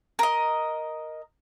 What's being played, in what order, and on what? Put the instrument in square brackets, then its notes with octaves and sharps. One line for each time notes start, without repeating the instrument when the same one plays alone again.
[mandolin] A#4 D#5